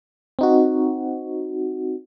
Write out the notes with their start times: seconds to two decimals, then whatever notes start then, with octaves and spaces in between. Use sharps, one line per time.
0.39 C4 D#4 F#4